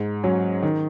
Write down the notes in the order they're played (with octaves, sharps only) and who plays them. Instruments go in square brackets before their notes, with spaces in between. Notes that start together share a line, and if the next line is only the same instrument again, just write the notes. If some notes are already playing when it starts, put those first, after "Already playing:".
Already playing: [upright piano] G#2
F#3 C#4
D#3